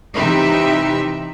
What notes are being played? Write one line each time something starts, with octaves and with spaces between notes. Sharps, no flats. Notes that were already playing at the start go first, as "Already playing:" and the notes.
C3 E3 D#4 G4 B4 E5